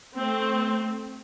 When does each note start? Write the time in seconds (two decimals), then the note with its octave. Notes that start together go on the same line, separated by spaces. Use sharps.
0.15 A3 C4